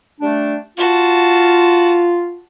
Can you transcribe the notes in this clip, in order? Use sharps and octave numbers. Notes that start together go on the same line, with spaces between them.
G3 A3 D4
F4 F#4 A5